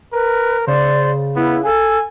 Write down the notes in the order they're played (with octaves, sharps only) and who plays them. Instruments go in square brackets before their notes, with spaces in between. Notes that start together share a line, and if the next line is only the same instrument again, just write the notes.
[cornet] A#4 [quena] B4
[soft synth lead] C#3 [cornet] C5 [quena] D5
[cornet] B3 [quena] E4
[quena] A4 [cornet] G#5